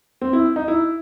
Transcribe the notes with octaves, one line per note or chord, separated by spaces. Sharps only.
C4
E4
D#4
E4